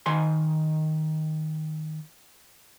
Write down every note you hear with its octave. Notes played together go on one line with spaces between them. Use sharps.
D#3 G#5 C6